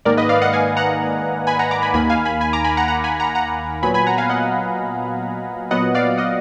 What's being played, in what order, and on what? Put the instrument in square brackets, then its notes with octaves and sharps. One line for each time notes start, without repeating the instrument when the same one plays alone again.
[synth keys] G#2 D#3 A#3 A#4 D5
B4 D#5
D5 F5
D#5 F#5
F5 G#5
F#5 A#5
G#5 B5
F#5 A#5
A#5 D6
G#5 B5
D#2 D#3 A#3 G#5 B5
F5 G#5
G#5 B5
G#5 B5
A#5 D6
G#5 B5
F#5 A#5
F#5 A#5
G#5 B5
F#5 A#5
F#5 A#5
A#2 F#3 B3 G#5 B5
G#5 B5
F#5 A#5
F5 G#5
D#5 F#5
A#2 F#3 B3 D#5 F#5
D5 F5
D#5 F#5